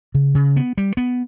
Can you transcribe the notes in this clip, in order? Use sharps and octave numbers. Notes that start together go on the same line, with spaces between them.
C#3
C#3
B3
G3
B3